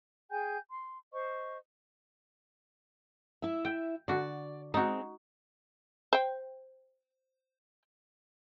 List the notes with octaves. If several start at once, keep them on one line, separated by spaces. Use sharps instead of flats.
G#4 G5 G#5 G6
C6
C5 D#5 C#6
E4 E5
G5
D3 F#4 D5
G#3 C4 D#4 F#4
C5 G5